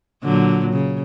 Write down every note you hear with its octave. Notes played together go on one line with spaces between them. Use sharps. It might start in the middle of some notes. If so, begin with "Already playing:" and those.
A#2 D3 F#3
C#3